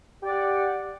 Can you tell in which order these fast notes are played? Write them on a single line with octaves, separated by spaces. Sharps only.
G4 D5 F#5